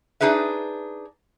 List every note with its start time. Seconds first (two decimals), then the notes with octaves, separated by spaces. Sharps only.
0.21 D4 D#4 G#4 B4 E5